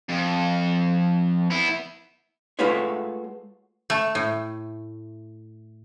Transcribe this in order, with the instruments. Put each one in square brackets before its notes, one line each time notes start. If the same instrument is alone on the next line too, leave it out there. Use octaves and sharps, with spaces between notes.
[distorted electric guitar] F2
B3 E4
[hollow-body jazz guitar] G#3 A3 F4 F#4 B4 C#5
[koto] A3
A2